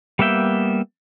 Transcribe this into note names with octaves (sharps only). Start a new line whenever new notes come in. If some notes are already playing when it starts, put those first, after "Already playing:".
G3 A#3 B3 E5 G5